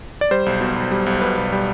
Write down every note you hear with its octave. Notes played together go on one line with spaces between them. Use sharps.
D5
G3 C5
B1
B2
B1
G3
B1
B2 B4
B1
G3